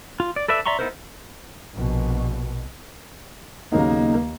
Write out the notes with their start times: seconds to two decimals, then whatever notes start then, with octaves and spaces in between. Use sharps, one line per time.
0.20 F4
0.36 D5
0.48 A4 B4 D5 E5
0.66 D5 E5 A#5 C6 C#6
0.79 B3 D#4 E4 A#4 C5
1.76 A#1 B2
3.72 D#2 C#3 F#3 A#3 B3 D#4 D#5